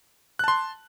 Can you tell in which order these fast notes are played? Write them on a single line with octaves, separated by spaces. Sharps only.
F#6 A5 C6